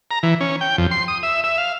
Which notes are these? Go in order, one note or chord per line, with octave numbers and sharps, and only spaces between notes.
A#5
E3
C#4
G5
F2
C6
D#6
E5
E5
F5